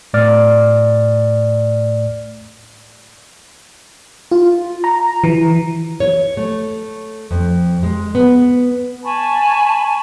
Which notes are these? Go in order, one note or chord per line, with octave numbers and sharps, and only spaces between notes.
A2 A3 D5 F6
F4
A#5
E3
C#5
A3
F2
G#3
B3
G#5 A5 B5 C#6